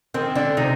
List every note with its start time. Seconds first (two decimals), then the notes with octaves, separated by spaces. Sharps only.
0.14 D#3 C4
0.35 D3 D4
0.57 C3 D#4